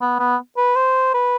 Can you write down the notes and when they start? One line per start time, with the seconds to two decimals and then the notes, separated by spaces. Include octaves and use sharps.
0.01 B3
0.20 B3
0.57 B4
0.76 C5
1.14 B4